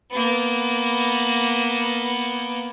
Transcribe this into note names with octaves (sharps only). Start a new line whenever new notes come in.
A#3 B3